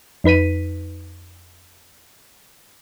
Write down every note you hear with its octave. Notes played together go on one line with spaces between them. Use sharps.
F2 D#4 B4 B6 D#7